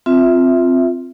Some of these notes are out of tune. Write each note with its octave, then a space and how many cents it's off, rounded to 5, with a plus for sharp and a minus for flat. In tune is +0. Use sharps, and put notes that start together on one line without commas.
C4 +0 F4 +0 E5 +0